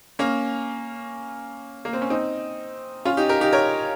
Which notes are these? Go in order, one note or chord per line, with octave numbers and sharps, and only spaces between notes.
A#3 C#4
A#3
C4
C#4
C4 D#4
C#4 F4
D#4 G4
G4 A#4
D#4 G4
A#4 C#5